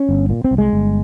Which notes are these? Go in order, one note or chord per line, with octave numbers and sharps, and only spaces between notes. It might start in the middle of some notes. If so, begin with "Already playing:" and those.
Already playing: C#4
G1
A#2
C4
C2
G#3
G1